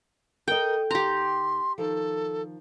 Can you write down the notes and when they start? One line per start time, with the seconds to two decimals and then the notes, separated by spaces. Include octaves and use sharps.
0.48 A4 A#4 D#5 G5
0.91 D#2 G4 G5 A#5 C6
1.78 D#3 F3 A4